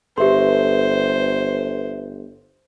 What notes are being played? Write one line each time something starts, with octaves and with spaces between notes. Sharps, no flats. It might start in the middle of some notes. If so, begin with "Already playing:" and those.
G1 G4 A4 B4 C5 E5 C6